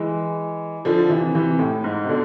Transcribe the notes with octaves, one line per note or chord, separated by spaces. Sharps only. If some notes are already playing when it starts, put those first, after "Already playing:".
Already playing: E3 G#3
D3 F3
C3 E3
C3 E3
A2
G#2
C3
B2 D3